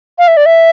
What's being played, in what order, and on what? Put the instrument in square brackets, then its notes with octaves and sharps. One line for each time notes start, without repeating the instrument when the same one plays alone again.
[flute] F5
E5
D5
E5